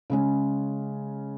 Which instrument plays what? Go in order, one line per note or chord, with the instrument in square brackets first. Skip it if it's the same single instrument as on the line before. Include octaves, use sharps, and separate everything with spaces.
[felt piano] C#3 G#3 C#4